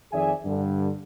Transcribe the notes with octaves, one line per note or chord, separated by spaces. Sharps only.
F2 D#3 G#4 D5 E5 G#5
G2 D3